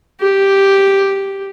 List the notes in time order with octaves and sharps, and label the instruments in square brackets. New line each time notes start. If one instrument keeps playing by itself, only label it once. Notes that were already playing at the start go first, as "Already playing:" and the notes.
[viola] G4